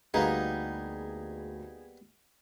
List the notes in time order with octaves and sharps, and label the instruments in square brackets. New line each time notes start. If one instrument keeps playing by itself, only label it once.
[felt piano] D2 [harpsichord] G3 A#3 B3 [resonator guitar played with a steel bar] D#4 [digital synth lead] G#4